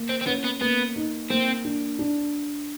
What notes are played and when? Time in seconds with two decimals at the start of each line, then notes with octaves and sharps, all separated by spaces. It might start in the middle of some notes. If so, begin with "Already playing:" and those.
Already playing: A#3
0.09 C4
0.21 C4
0.26 B3 C#4
0.44 B3
0.61 A#3 B3
0.96 D#4
1.30 A#3 C4
1.65 D4
1.99 D4